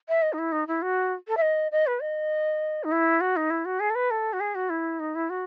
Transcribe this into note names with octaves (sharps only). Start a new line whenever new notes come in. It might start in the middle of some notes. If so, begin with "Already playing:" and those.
E5
D#5
D#4
E4
D#4
E4
F#4
A4
E5
D#5
D#5
B4
D#5
D#4
E4
F#4
D#4
E4
F#4
G#4
A4
B4
A4
F#4
G#4
F#4
E4
D#4
E4
F#4